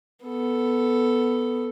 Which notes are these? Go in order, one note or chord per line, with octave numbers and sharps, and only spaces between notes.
B3 A4